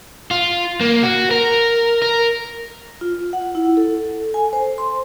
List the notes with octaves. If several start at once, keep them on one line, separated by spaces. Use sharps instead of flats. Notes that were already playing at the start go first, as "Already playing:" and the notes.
F4
A#3
F#4
A#4
A#4
F4
F#5
E4
A4
G#5
C5
C6